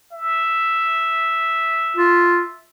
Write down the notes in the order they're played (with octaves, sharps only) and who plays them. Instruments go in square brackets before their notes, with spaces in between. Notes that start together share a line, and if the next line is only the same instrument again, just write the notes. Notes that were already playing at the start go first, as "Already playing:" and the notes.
[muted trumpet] E5
[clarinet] F4